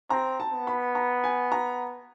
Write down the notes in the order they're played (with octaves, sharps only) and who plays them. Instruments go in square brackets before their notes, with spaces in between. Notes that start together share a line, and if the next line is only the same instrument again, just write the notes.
[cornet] C4 [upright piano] A#5
[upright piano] A5
[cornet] B3
[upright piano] B5
A#5
G#5
A#5